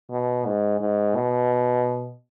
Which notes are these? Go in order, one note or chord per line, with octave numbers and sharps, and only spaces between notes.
B2
G#2
G#2
B2